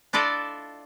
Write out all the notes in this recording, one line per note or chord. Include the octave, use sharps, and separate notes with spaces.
D4 E4 F4 A4 D5 D#5